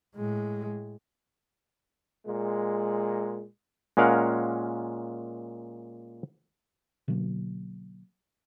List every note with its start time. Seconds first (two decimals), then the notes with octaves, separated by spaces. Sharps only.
0.16 A2 G#3
2.26 A#2 G#3
3.97 A#2 G#3 C#4 A#4 F5 F#5
7.08 B2 D3 F#3 A#3